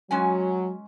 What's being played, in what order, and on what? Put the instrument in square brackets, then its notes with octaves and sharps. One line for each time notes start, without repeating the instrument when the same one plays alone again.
[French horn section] F#3 [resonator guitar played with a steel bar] G#3 C#4 G#5